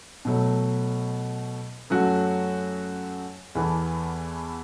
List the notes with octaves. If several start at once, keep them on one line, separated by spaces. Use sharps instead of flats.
B2 F#3 A3
F#2 F#3 A3 F#4
E2 E3 B3 A4